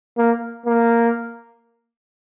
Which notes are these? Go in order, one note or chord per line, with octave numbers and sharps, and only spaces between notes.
A#3
A#3